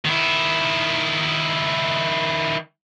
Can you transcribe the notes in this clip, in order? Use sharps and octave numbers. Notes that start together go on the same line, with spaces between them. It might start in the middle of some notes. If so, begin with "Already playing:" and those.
D#3 E4